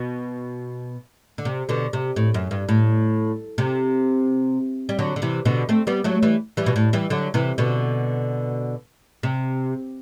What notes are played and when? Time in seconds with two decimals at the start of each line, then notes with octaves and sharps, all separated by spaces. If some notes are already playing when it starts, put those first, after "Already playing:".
Already playing: B2
1.38 D3
1.45 C3
1.69 B2 D3
1.93 C3
2.16 A2
2.34 F#2
2.51 G2
2.69 A2
3.58 C3
4.89 G3
4.99 D3 F#3
5.16 D3
5.22 C3 E3
5.45 B2 D3
5.69 A3 C4
5.87 G3 B3
6.04 F#3 A3
6.23 E3 G3
6.57 E3 G3
6.66 B2
6.76 A2
6.93 E3 G3
7.10 D3 F#3
7.34 C3 E3
7.58 B2 D3
9.23 C3